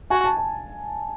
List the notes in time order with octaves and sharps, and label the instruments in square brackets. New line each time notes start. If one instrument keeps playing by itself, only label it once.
[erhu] F#4 [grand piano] G#5
[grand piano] A5
A5